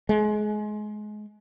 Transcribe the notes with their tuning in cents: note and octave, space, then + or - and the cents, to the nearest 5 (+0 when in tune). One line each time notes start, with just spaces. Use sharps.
G#3 +25